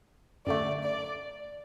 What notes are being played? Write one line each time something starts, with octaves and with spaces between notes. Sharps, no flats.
F#2 D3 A3 D5
D5